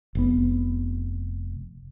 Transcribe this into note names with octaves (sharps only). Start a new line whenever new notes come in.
F1 B3